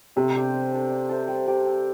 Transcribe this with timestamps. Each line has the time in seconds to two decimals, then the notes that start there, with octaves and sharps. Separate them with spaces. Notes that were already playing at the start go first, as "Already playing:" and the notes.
0.16 C3 A3
0.35 D4 G4 C5
0.54 G3
0.72 D4 A4
0.91 D4
1.09 A4 C5 E5
1.28 G3
1.46 C4 G4 D5
1.65 C4